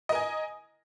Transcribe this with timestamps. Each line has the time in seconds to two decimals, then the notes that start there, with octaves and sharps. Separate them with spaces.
0.09 D#5
0.12 A#4
0.15 G#5